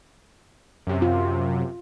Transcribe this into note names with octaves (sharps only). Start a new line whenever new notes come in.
F#2 C3
F4